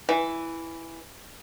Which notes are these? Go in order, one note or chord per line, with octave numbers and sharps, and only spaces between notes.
E3